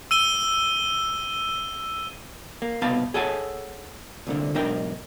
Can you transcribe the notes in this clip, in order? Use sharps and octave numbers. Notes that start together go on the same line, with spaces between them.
E6 D#7 G7
A#3
C2 B2 B3 F5 A5
G#4 A4 C#5 F#5 G#5 A5
C2 A#2 D3
B1 G#2 D4 A#4 G5